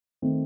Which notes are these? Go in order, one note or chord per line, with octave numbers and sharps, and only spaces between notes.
D#3 A3 C4